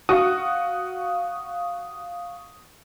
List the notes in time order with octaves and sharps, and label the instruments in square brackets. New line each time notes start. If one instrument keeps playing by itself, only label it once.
[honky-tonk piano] F#4 [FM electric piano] F5 C#6 D#6